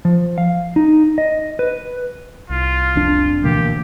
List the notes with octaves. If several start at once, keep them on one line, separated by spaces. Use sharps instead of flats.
F3
F5
D#4
D#5
B4
C2 F4
F1 F2 D4
D2 B2 E3 A#3 G4